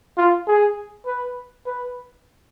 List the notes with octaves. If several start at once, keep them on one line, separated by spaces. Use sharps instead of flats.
F4
G#4
B4
B4